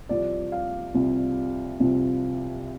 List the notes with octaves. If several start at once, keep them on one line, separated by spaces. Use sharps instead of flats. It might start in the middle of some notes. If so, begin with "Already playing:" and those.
C2 C3 F3 D5
F5
C2 C3 F3
C2 C3 F3